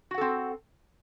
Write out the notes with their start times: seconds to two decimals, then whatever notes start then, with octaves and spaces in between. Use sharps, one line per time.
0.11 F#4
0.14 F#5
0.18 A4
0.21 C4